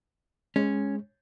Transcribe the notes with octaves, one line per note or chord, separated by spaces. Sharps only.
G#3 C#4